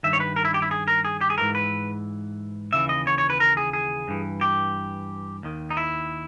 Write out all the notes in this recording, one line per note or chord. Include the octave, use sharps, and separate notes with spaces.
G2 D#3 E5
C#5
B4
A#4
E4
G4
E4
G#4
A#4
G#4
G4
G#4
G#2 E3 A#4
B4
D#2 C#3 E3 E5
D#5
C#5
C#5
B4
A#4
G#4
G#4
G2 E3
G4
D#2 D#3
D#4
E4